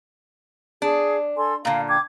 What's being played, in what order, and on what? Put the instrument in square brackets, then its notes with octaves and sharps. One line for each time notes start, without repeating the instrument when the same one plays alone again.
[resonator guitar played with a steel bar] D4 [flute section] G#4
[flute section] A4 G#5 C6
[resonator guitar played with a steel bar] A#2 D3 [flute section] F5
[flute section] G5 D6 G#6